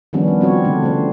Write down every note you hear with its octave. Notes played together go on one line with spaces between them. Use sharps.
D#3 F3 G3 B3 C#4 D4
G3
G3 C4 F4 F#4 C#5
D3 A3 D4
C#3 A3 C5